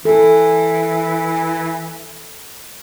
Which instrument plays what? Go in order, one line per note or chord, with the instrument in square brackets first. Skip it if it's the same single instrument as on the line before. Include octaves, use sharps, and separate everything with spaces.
[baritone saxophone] E3 [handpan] A4